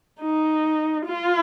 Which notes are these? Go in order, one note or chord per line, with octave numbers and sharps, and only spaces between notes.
D#4
F4